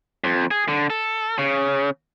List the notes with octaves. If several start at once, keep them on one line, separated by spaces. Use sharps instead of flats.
F2
G#4
D3
A4
C#3